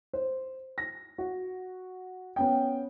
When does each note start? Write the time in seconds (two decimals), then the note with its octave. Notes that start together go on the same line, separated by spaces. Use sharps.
0.13 C5
0.78 A#6
1.18 F#4
2.36 B3 C#4 G5